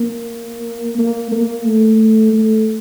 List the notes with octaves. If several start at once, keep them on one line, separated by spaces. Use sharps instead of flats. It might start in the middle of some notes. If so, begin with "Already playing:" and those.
Already playing: A#3
A#3
A#3
A3
A3